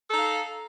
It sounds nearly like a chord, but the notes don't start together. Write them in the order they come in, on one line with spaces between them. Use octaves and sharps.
A4 D#4 F5